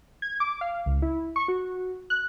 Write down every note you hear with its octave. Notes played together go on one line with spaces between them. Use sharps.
G#6
D6
F5
C#2
E4
C#6
F#4
F#6